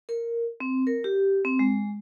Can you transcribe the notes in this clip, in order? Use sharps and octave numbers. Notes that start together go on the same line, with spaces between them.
A#4
C4
A#4
G4
C4
G#3